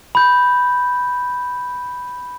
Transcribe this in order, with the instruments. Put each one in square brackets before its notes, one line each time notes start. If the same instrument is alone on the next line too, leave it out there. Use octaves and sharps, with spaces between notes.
[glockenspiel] B5 G6